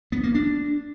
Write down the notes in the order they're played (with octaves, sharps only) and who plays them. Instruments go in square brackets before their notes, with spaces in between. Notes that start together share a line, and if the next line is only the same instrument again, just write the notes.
[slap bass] B3
A#3
D4